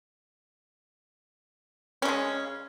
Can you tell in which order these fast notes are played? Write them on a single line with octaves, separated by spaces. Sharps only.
C#4 C#3 G#3